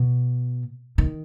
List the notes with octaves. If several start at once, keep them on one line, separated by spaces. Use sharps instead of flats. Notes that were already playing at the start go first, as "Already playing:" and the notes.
Already playing: B2
D#3